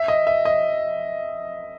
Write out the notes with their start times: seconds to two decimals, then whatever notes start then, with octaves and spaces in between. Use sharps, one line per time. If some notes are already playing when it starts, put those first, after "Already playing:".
Already playing: E5
0.08 D#5
0.27 E5
0.45 D#5